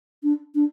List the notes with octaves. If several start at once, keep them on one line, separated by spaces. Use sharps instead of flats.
D4
D4